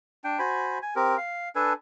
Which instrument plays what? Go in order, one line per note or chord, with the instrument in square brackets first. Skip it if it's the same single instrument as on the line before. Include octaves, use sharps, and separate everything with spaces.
[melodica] D4 G5
F#4 C5 G#5 B5
G#5
C4 G4 A#4
F5
D4 A4 B4 G#5